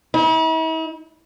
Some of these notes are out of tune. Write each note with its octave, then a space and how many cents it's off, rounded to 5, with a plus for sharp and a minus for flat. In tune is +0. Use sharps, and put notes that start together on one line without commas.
E4 -45